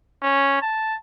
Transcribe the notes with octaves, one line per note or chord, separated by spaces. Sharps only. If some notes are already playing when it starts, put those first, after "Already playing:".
C#4
A5